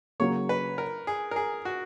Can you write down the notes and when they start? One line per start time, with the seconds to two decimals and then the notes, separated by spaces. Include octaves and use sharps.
0.20 C#3 F#3 A#3 C#5
0.49 B4
0.78 A#4
1.07 G#4
1.31 A#4
1.36 G#4
1.65 F#4